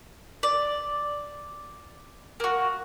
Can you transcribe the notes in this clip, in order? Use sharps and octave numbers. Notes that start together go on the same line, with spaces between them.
D5
A#3 F#4